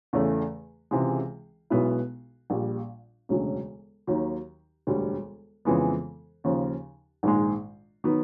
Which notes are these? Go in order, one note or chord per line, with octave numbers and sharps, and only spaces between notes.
E2 C#3 E3 A3
C#2 C3 E3 G#3
B1 B2 G#3 B3 E4
A#1 A#2 G3
E1 D2 C#3 F#3
D#2 D#3 F#3
E1 D2 D3 G3
F2 C#3 E3 G#3 B3
D#2 C#3 F3
A#1 G#2 D#3 G#3
D#3 F#3 B3